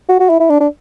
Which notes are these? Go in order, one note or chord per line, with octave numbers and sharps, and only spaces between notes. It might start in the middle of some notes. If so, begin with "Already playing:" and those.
F#4
F#4
E4
E4
D4
D4